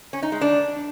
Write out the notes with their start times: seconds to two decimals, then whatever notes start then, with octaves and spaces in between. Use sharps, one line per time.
0.13 C#4
0.23 D#4
0.32 G#3
0.41 D4